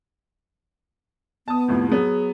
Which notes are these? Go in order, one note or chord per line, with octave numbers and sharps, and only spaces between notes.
B3 A5 D#6
C2 F2 A2
F#3 B3 G#4